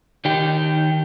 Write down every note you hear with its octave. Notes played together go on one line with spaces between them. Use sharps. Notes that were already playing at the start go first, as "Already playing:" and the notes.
D#3 G4